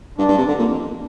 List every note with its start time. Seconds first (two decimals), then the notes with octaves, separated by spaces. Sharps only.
0.18 G2 D4
0.29 G2
0.38 C3
0.48 D3
0.59 A#2
0.71 F2